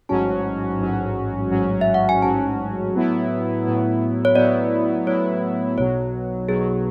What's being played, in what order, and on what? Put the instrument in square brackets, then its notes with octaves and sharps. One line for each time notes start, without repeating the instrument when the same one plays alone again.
[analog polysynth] A1 G#2 F#3 C#4 F#4 [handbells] A5
[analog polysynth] A1 G#2 F#3 C#4 F#4
A1 G#2 F#3 C#4 F#4
[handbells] E5
F#5
G#5
[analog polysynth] A1 G#2 F#3 C#4 F#4 [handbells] A5
[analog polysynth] A2 F#3 B3 E4
A2 F#3 B3 E4
[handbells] C#5
[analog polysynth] A2 F#3 B3 E4 [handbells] D5
[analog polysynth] A2 F#3 B3 E4 [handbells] C#5
[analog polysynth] B1 B2 F#3 [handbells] C#5
[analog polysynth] B1 B2 F#3 [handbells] G#4